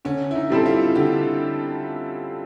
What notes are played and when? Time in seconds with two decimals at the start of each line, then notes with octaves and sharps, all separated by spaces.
0.05 D3 C#4
0.31 E4
0.35 D#4
0.50 G3 C4 E4 A4
0.66 F4
0.95 D3 G4